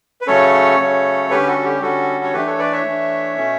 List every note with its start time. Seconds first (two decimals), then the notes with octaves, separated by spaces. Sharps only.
0.21 B4
0.27 C#3 F#3 A3 C#4 A4 C#5
0.79 C#3 F#3 A3 C#4
1.30 D3 G3 C#4 G4 B4
1.47 F#4 A4
1.58 F#4
1.64 G4
1.82 D3 G3 C#4 F#4 A4
2.24 C#5
2.33 E3 A3 D4 G4 B4
2.46 A4 C#5
2.59 B4 D5
2.72 C#5 E5
2.85 E3 A3 D4
3.37 B2 A3 C#4